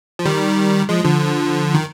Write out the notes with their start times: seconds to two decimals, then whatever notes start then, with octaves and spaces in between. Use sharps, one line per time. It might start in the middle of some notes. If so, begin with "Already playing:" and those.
0.19 F3
0.25 D#3 G3
0.89 F3 G#3
1.04 D3 F3
1.74 D#3